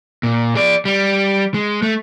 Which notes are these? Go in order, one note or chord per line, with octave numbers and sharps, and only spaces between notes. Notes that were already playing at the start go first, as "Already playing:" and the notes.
A#2
G#4 D5
G3
G#3
A3